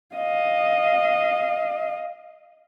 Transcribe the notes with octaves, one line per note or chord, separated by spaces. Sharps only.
D#5 F5